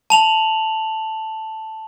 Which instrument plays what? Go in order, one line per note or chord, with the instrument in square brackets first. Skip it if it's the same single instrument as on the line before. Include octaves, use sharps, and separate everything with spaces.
[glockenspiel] A5 F7 F#7